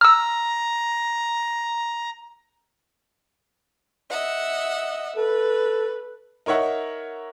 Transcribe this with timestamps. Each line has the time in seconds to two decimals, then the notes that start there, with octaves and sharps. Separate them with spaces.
0.01 A#5 E6 F6
4.10 D#5 E5 F#5
5.16 A4 B4
6.46 D#4 A#4 C#5 E5 F#5